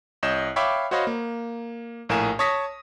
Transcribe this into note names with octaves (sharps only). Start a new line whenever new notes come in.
C2 C#5 D#5 G6 E7
C#5 E5 F5 G5 B5 D6
F#4 C5 C#5 D#5 F5 B5
A#3
A#1 A2 A#4 F5 G#5 E7
C#5 A5 C#6 D#6 A#6 B6